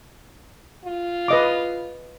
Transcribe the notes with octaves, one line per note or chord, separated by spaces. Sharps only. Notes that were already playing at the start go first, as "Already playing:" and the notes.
F4
B4 D#5 D6